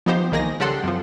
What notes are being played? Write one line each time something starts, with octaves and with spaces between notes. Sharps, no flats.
F3 B3 D#4 G4 C5
C2 D#3 A#3 G#4 A#6
C#3 G3 G4 A4 F#5 C6
F#2 C3 F3